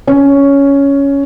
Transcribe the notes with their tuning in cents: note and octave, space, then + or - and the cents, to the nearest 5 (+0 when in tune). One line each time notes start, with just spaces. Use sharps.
C#4 +10